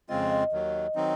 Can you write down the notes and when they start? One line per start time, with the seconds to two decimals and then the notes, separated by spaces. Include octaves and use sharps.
0.09 F2 C#3 G#3 C4 F4 D#5
0.31 D#5
0.52 D#2 D#3 F#3
0.95 D#3 F#3 C4 D#4